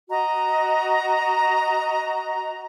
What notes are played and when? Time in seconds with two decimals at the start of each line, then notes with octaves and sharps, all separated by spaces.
0.09 F#4 D#5 A#5